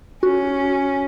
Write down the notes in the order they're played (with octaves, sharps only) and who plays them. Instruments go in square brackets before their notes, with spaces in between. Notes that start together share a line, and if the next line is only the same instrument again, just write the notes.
[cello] C#4 [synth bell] F#4